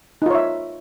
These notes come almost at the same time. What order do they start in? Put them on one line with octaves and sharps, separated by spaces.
D#4 F4 C#5 E5